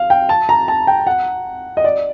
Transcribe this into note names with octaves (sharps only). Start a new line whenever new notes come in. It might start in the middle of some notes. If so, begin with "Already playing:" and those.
Already playing: F5
G5
A5
A#5
A5
G5
F#5
D#5
D5